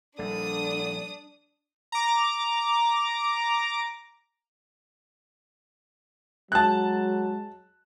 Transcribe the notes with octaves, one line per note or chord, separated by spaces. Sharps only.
A#1 D3 G3 D4 D#6
A#5 D6
F#3 G#3 A5 F#6